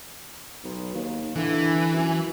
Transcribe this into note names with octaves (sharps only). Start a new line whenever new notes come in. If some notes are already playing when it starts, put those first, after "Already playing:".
B1
D#2
D3 E3
F#2